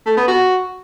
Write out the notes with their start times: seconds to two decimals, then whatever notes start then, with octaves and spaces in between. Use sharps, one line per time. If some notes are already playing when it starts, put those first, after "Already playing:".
0.06 A3
0.17 B3
0.28 F#4